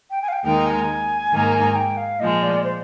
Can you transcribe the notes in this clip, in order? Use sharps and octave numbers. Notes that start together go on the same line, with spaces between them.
G5
G#5
F5
G5
D#2 D#3 G#3 D#4 A#4 G5
G#5
G#2 D#3 A#3 D#4 A#4
G5
F5
A#2 F3 G#3 D#5
D5
C5